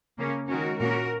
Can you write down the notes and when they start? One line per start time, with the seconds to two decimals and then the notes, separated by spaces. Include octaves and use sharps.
0.18 C#3 A#3 C#4
0.48 D#3 G#3 C#4 F#4 A#4
0.79 A#2 A#3 C#4 F#4 A#4